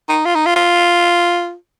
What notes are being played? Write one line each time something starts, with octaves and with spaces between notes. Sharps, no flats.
D#4
F4
D#4
F4
F4